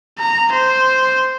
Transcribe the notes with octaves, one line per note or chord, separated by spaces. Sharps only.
A#5
C5